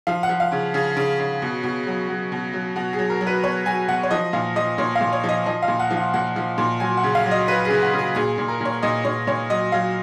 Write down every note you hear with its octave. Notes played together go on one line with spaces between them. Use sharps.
F3 F5
F#5
F3
F5
C#3
C#3 G#4
C#3
C#3
B2
B2
F#3
F#3
B2
F#3
B2 F#4
G#4
F#3
A#4
F#3
B4
B2 C#5
F#3 G#5
B2 F#5
C#5
F3 D#5
A#2 F5
F3 D#5
A#2 C#5
F5
A#2
C#5
F3 D#5
F3 D#5
F5
A#2
F#5
F3
F#5
A#2 F#5
F3
A#2
F#3 G#5
F#5
C#3
F5
F#3
D#5
F#3 B4
G#4
C#3
F#4
C#3
G#4
A#2 G#4
A#2
A#4
A#2 C#5
A#2 D#5
A#2 C#5
A#2 C#5
F#3 D#5
F#3 F5